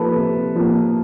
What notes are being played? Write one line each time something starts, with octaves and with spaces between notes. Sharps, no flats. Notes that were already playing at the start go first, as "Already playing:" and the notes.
Already playing: F3 A#3 A4 B4
C3
F3 A#3